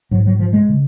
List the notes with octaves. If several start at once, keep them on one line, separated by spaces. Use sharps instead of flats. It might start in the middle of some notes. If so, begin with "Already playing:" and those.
G#2 F#3
F#3
F3
G#3
C#3